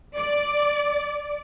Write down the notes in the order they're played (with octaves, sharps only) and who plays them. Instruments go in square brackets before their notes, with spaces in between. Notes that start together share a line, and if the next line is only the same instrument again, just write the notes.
[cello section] D5